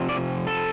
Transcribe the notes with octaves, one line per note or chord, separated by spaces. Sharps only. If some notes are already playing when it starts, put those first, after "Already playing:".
Already playing: F2 C3
D5
A4